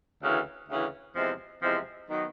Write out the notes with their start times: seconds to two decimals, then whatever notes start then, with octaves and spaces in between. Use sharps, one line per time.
0.22 D2 C#3 E3
0.68 D2 C#3 E3
1.15 E2 C3 F3 G#3 C4
1.62 E2 C3 F3 G#3 C4
2.08 D#3 F#3 B3 D#4